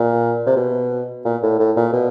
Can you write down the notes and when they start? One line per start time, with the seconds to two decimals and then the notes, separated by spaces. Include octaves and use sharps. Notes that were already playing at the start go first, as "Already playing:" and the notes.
Already playing: A#2
0.47 C3
0.57 B2
1.25 A#2
1.43 A2
1.59 A2
1.76 A#2
1.93 B2